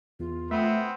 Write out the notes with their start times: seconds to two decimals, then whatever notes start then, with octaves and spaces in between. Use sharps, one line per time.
0.20 E2 F4
0.51 A3 B3 C4 E5